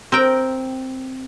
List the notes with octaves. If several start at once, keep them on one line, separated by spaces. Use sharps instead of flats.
C4 A#4 G5